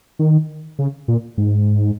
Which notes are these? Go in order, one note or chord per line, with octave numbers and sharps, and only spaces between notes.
D#3
C#3
A#2
G#2